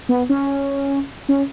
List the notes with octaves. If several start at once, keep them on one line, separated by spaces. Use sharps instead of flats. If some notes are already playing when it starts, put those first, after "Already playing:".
B3
C#4
C#4